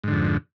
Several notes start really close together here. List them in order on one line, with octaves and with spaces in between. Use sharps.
G#2 D3 F2